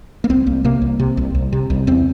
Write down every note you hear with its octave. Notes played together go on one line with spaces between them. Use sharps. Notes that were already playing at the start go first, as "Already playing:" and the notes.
A#3
C2 C4
C2 A#3
C3 A#3
C2
C3
C2
C2
C3
C2
E2 C4